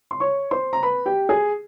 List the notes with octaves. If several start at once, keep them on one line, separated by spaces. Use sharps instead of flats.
C6
C#5 C#6
C5 C6
A#5
B4 B5
G4 G5
G#4 G#5